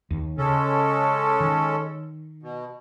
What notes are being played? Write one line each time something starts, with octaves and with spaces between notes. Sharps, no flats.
D#2
C#3 G#3 C#4 A4
D#3
B2